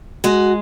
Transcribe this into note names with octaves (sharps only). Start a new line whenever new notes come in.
G#3 F#4